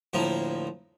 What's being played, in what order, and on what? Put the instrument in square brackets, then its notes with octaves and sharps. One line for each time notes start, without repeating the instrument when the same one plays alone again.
[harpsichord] D2 A2 F3 A#3